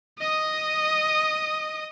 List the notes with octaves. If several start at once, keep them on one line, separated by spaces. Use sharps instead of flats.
D#5 D#6